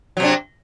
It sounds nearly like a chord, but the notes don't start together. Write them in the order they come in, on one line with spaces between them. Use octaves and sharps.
F#3 C3 D4